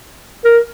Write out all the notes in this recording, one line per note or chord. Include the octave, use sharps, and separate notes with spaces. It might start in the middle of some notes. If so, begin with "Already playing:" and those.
A#4